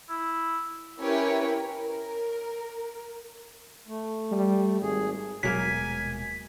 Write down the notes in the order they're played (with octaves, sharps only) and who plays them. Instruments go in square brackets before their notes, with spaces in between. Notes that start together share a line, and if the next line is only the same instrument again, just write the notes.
[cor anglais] E4
[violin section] C#4 E4 G4 A#4 B4 C#5
A#4
[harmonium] A3
[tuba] G3
[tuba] G#1 [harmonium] G#4
[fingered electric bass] D#1 B2 G#3 [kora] F#3 A#3 F5 [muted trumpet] G#5 [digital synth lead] B6